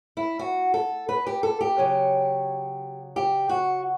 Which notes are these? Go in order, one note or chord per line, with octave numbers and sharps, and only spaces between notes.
E4
F#4
A4
B4
G4
A4
G4
C#3 F#3 C#4
G4
F#4